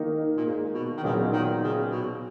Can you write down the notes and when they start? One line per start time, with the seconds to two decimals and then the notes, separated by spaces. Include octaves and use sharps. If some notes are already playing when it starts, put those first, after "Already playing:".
Already playing: D#3 A#3 D#4
0.37 A#2
0.45 G#2
0.73 B2
0.97 D#3
1.03 A#2 C#3 F#3 B3 D#4
1.32 D#3
1.63 C#3
1.91 B2